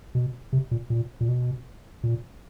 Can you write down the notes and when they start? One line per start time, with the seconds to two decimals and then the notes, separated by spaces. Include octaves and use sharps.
0.15 B2
0.53 C3
0.71 A#2
0.90 A#2
1.21 A#2
1.28 B2
2.04 A#2